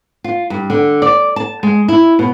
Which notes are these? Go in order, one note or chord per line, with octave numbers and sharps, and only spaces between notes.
F4
G2
D3
D5
A5
G#3
E4
B2